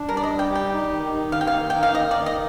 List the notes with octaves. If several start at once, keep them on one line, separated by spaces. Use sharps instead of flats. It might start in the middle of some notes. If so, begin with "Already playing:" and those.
Already playing: D4
G3 A#4
D5
D#5
G3
G5
G4
G5
D#4
D#3
D#4
D#3 F5
G5
F5
A#3
D#4 G5
F5
D#3 D#5
D5
D#3
D#5